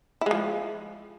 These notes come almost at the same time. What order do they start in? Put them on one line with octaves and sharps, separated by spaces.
E4 G#3 F3